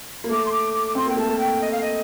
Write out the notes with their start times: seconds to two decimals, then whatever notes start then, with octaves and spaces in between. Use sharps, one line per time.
0.24 A#3
0.29 A3 D6
0.46 C6
0.52 D6
0.74 D6
0.88 D6
0.95 C4 C6
1.05 A#3 G5
1.17 A3 A5
1.27 A#3
1.39 G5
1.61 D#5
1.72 F5
1.82 D#5